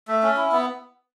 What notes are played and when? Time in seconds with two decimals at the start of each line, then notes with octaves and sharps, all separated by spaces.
0.08 A3
0.23 C#4
0.37 E4
0.52 B3